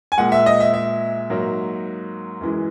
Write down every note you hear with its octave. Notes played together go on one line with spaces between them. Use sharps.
G#5
A#2 G#3 F#5
E5
D#5
E5
E5
G#2 F#3 A#3
F#2 E3 G#3